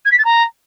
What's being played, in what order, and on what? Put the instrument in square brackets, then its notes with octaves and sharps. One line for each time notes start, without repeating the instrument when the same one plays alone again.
[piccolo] G#6
B6
A6
A#5